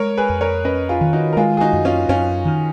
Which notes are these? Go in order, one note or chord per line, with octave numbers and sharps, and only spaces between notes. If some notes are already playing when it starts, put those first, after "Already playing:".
Already playing: G#3 A#4 C#5
G#4 B4
F2
A#4 C#5
C#4 B4 D#5
F4 G#4
D#3
D#4 F#4
A#4
G#3 F4 G#4
G#4
D#4 F#4
F#2
C#4 F4
F#2 C#4 F4
D#3